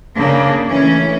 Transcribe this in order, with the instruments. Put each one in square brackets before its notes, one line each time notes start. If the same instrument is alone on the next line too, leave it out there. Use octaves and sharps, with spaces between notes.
[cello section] C#3 A#3 D4
E3 A3 C#4